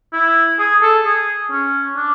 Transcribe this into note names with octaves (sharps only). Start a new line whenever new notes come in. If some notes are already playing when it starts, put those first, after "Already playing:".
E4
G#4
A4
G#4
C#4
D4